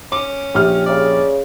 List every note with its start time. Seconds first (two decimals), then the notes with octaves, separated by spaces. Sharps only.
0.12 C#4 D6
0.55 A#1 G4 F6
0.86 C#3 D5